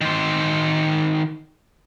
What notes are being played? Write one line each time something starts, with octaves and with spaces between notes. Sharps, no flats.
D#3 C5